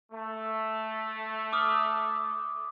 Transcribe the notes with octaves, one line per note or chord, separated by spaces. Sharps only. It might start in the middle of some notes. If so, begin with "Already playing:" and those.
A3
D6 D#6 F6